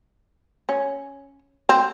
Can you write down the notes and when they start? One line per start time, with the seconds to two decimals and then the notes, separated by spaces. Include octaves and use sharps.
0.69 C#4
1.69 C4